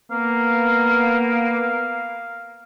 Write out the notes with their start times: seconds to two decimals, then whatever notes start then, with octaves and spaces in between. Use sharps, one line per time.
0.11 A#3 B3 F5